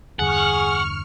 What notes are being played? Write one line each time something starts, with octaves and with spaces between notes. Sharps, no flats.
E2 G2 D3 G#4 F#5 C#6 F6